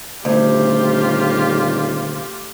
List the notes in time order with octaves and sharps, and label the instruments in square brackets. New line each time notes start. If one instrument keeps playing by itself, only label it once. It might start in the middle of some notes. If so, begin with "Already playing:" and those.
[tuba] D#1 [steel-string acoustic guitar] D2 [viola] F4 G4